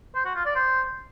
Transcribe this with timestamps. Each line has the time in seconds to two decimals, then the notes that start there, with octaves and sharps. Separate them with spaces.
0.15 C5
0.25 F#4
0.35 F4
0.45 D5
0.55 C5